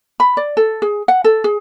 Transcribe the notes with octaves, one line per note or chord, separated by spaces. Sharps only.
B5
D5
A4
G#4
F#5
A4
G#4